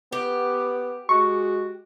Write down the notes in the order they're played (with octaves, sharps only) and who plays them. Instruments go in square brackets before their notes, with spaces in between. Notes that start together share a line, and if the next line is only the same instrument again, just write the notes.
[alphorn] B3 [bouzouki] G4
[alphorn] G#3 [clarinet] F#4 [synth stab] C#6